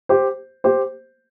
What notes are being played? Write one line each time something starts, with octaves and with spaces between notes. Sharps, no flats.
G4 C5
G4 C5